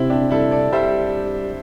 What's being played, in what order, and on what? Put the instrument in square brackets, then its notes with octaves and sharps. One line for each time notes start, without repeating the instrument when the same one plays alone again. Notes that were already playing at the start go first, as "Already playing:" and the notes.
Already playing: [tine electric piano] C3 [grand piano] C4 E4
[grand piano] D4 G4
[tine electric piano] G3 [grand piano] E4 A4
[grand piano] A4 D5
[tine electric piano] G3 [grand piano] C5 E5